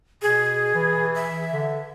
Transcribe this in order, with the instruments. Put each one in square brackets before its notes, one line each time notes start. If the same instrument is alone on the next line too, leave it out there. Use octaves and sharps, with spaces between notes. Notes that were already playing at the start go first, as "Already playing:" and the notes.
[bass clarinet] B2 [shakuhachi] G#4
[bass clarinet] E3
[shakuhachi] E5
[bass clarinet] D3